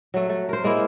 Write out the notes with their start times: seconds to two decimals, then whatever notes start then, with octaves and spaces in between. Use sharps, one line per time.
0.14 F#3 A3
0.29 A3
0.49 A#4 C5
0.64 G#3 A#3 E4